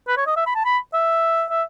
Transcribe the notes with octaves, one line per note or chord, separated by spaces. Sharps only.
B4
C#5
D#5
E5
B5
A5
B5
E5
E5